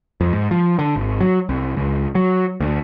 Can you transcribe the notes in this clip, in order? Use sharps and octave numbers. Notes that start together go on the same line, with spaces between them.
F2
G#2
F3
D3
G#1
F#3
C2
C#2
F#3
D2